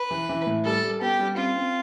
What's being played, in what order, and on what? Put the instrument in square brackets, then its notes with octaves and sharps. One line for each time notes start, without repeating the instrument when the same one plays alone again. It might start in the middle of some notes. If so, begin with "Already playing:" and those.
Already playing: [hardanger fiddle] B4
[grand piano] E3
E3
A2
[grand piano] G3 [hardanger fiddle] A4
[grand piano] G3
[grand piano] B3 [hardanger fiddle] G4
[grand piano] G3
[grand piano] C4 [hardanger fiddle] F4
[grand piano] C4